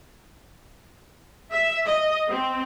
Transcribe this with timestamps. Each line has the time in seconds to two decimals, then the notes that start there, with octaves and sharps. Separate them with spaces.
1.52 E5
1.86 D#5
2.29 C4